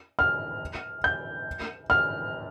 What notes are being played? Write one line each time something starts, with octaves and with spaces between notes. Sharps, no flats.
F6
G6
F6